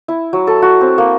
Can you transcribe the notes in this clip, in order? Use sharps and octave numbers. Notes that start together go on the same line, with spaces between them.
E4
F#3
A4
F#4
C4
A#3